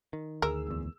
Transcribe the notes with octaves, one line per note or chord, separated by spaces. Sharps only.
D#3
D2 G#4 A#4 E6
G#1 E2